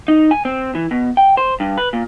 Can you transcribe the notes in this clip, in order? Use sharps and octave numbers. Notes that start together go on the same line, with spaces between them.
D#4
G#5
C4
E3
B2
G5
C5
G2
B4
A#2